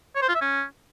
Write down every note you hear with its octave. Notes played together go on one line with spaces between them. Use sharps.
C#5
C5
F4
E5
C#4